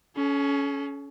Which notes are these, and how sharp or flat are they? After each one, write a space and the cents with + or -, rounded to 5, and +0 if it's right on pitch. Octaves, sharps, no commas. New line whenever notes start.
C#4 +15 A4 -40